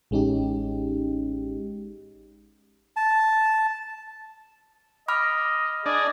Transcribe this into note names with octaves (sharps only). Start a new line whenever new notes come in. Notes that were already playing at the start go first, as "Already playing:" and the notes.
A1 G#3 C#4 D#4 G4
A5
D#5 B5 D6 F6
D4 G#4 D5 D#5